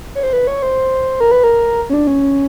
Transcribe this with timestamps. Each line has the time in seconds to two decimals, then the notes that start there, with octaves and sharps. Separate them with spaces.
0.15 C#5
0.23 C5
0.33 B4
0.47 C#5
0.63 C5
1.20 A#4
1.31 B4
1.44 A#4
1.90 C#4
1.93 D4
2.07 C#4